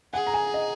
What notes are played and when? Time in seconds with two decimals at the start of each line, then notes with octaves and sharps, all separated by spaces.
0.14 G#4 F#5
0.27 A#5
0.34 G#5
0.54 D#5